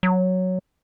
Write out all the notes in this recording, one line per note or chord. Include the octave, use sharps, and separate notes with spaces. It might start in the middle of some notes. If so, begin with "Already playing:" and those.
F#3